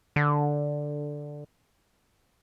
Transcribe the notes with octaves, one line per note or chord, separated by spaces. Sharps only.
D3